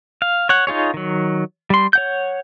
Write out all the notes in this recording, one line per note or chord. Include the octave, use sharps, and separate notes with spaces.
F5
C#5 F#5
D#4 F4 G#4 C#5
D#3 F#3
G3 C6
C#5 F#5 G6